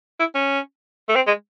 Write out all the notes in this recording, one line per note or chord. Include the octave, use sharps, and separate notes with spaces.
E4
C#4
A3
C4
G#3